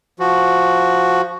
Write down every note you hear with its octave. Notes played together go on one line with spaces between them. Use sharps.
F3 F#4